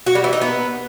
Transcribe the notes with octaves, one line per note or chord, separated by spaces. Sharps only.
F#4
G3
E3
D#4
B3